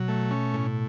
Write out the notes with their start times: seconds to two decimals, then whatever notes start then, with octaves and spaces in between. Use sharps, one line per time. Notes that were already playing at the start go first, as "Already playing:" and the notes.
Already playing: B2 F#3
0.08 A3
0.31 C#4
0.54 A2